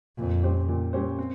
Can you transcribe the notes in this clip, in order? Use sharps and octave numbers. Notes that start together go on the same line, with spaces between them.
F2 A#2
G3 C#4 G4 C5
A#2
G3 C#4 G4 C5
C4